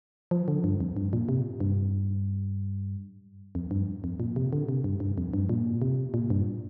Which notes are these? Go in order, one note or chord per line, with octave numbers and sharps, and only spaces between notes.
F3
D3
G2
F2
G2
A#2
C3
G2
F2
G2
F2
A#2
C3
D3
C3
G2
G2
F2
G2
A#2
C3
A#2
G2